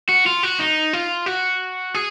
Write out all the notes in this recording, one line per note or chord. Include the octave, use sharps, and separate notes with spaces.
F#4
F4
F#4
D#4
F4
F#4
G#4